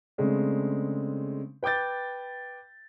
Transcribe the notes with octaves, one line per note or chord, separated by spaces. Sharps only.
C#3 G#3 A3 C4 D4
B4 G5 D6 G6 A6